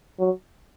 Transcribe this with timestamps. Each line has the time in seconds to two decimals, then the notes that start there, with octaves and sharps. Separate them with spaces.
0.19 F#3